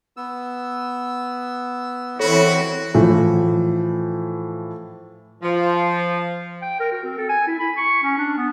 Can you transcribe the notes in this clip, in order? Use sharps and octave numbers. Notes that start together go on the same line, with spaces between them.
B3 E6
E3 C4 E4 F#4 A4 C#5 B5
A2 E3 F3
F3
G5
A#4
F#4
C4
A4
G#5
E4
B5
C#6
C#4
D4
B3